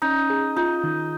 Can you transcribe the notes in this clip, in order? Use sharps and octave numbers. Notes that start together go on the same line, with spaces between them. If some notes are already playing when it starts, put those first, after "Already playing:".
C#4 D#4
G#4
D#4 F4
D#3